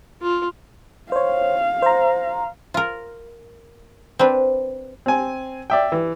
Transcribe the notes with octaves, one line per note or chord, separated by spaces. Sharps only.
F4
C5 C#5 F5
C5 A#5
F4 A#4
C4 D4 B4
C4 G#5
D5 E5 G5
E3